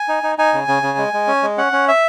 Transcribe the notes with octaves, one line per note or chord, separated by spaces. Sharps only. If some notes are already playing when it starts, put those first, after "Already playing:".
Already playing: G#5
D#4
D#4
D#4 G#5
C#3
C#3
C#3
G#3
G#3
C#4
G#3
C#4 F#5
C#4
E5